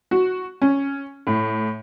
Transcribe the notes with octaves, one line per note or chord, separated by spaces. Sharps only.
F#4
C#4
A2